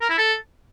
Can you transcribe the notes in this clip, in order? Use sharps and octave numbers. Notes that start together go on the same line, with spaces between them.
A#4
E4
A4